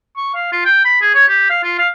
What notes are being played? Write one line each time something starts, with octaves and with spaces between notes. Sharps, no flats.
C#6
F5
F4
G5
B5
G#4
C#5
G4
F5
F4
F5